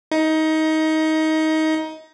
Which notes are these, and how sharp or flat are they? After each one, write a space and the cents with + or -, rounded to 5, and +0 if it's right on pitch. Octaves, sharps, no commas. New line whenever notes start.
D#4 +20